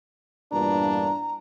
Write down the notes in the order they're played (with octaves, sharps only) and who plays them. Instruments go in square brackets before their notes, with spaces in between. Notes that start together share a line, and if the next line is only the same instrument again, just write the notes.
[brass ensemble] E2 G2 A#2 [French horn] D4 [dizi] A#5